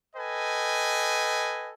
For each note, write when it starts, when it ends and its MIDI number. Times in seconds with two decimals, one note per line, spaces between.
0.16 1.72 69
0.16 1.72 71
0.16 1.72 75
0.16 1.72 79
0.16 1.72 80